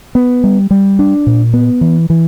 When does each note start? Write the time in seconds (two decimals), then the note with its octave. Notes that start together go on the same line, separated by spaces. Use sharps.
0.15 B3
0.44 G3
0.71 G3
0.99 D4
1.27 A#2
1.53 B3
1.81 E3
2.10 E3